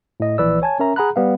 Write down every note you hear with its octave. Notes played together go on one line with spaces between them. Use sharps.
A2 D#5
A#1 E3 B4 D5 E6
C#5 G#5 A5 G#6
C#4 A#4 E5 A#5
G#4 F#5 A#5 B5 F#6
G3 B3 F5